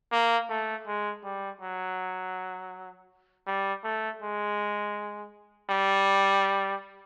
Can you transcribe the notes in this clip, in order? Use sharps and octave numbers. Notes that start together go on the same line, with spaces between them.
A#3
A3
G#3
G3
F#3
G3
A3
G#3
G3